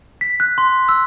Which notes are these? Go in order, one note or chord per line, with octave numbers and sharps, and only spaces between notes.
B6
F#6
C6
E6